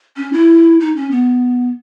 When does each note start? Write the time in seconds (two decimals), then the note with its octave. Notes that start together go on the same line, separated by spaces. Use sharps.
0.17 C#4
0.33 E4
0.80 D#4
0.96 C#4
1.11 B3